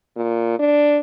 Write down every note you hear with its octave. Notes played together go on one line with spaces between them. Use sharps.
A#2
D4